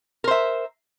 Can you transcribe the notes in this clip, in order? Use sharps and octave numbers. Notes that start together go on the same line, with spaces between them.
A#4 C5 E5